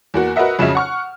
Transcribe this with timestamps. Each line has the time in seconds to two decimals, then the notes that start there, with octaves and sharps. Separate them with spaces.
0.14 E2 A#3 F#4
0.36 F#4 A#4 B4 D#5 E5 F#5
0.59 F2 C#3 F#3 C#4 E5
0.75 F#5 C#6 F6